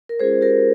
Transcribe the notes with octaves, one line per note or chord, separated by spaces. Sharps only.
A#4
G#3 C#4 F4 G#4 C5
G4 A#4